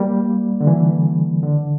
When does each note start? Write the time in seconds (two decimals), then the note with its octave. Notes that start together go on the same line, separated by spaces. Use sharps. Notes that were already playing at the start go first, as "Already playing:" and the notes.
Already playing: G3 A#3
0.60 D3
0.67 E3
1.43 D3